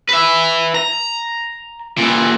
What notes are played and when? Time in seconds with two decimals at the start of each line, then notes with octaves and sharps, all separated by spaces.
0.09 B4 E5
0.75 A#5
1.97 A#2 E3